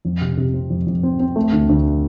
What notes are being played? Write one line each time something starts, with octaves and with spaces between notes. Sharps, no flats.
F2
C3
C3
C4
F2
F2
C4
C4
A3
D2
D2